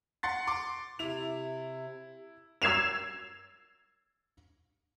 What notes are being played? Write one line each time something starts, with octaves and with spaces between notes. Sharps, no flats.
F#5 C6 A6
C6 D6
C3 E4 F7
E6 G#6 C7 E7 F7